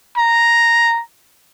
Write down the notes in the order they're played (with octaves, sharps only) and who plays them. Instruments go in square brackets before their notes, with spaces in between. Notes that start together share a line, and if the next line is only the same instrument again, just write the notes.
[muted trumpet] A#5